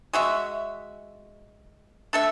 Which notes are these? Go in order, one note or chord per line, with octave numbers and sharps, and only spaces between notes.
G#3 F#4 E5
D4 A4 E5